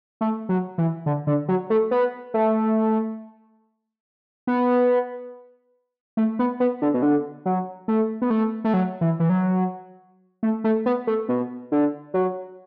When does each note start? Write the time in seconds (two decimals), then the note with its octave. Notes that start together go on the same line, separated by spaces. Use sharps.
0.21 A3
0.49 F#3
0.78 E3
1.06 D3
1.27 D3
1.48 F#3
1.70 A3
1.91 B3
2.34 A3
4.47 B3
6.17 A3
6.39 B3
6.60 B3
6.82 D3
6.94 B2
7.02 D3
7.46 F#3
7.88 A3
8.22 B3
8.30 A3
8.64 A3
8.74 F#3
9.01 E3
9.20 E3
9.30 F#3
10.43 A3
10.64 A3
10.86 B3
11.07 A3
11.29 B2
11.72 D3
12.14 F#3